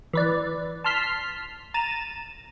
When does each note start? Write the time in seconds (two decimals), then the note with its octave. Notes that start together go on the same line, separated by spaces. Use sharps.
0.13 E3 B4 D5
0.84 A5 C6 F6 B6 C7
1.74 A#5 A6 D#7 E7